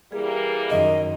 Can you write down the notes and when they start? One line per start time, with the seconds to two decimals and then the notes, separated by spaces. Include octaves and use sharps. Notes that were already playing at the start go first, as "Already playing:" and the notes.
0.12 E3 G3 A#3 G#4
0.70 F#2 D#3 D#5